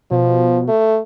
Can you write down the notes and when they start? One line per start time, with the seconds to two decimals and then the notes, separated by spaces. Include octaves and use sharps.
0.11 B2 F3
0.68 A3